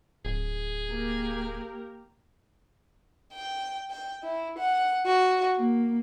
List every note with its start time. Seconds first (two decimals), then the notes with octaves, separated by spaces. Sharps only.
0.25 D1 G#4
0.90 A#3 G4 A#4
3.33 G5
3.90 G5
4.23 E4
4.59 F#5
5.06 F#4
5.58 A#3